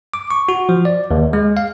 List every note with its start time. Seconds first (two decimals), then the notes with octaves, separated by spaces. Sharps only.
0.14 D6
0.31 C#6
0.49 F#4
0.69 F3
0.85 D5
1.11 D#2
1.33 G#3
1.57 F5